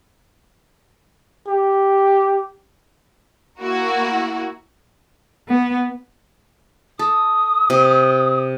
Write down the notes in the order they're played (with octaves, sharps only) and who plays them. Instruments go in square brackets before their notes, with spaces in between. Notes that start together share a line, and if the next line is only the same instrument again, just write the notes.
[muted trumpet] G4
[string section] A#3 E4 F#4 A#4
[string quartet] B3
[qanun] A4 [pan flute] D#6
[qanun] C3